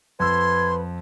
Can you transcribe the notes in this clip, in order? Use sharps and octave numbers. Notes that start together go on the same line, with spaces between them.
F2 B4 C6 E6 G#6